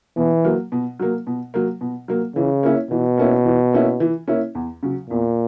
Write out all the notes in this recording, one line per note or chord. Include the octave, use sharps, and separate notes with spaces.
B2 E3
F#3 A#3
B2
F#3 A#3
B2
F#3 A#3
B2
F#3 A#3
C#3 E3
A#3 C#4 E4
B2 E3
A#3 C#4 E4
E3
A#3 C#4 E4
E3
A#3 C#4 E4
E2
C#3 F#3
E2 A#2